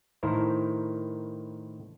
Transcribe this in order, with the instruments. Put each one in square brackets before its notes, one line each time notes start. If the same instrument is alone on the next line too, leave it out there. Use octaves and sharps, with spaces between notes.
[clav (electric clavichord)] A2 D#3 E4 A#4 C5